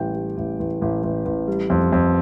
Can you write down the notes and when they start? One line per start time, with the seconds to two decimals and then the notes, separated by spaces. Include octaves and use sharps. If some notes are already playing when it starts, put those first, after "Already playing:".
Already playing: A1 G3 G5
0.15 G3
0.37 A1
0.59 A1
0.82 A1
1.03 A1
1.25 A1
1.48 G3
1.70 F2
1.92 F2